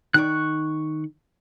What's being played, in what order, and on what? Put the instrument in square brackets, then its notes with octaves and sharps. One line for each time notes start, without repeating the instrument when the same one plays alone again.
[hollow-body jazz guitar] D#3 D#4 D5 [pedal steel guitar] C#6 F#6